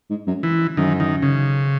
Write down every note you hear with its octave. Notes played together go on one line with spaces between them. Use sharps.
G#2
F#2
E3
F#2 D#3
D#3
C#3